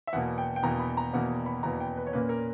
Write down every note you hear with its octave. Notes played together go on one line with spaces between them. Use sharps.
E5
E2 B2 A#3 F#5
G5
G5
E2 B2 A#3 A#5
B5
A#5
E2 B2 A#3 F#5
B5
E2 B2 A#3 A#5
G5
B4
C#5
A#2 A#3 C#4 B4
A#4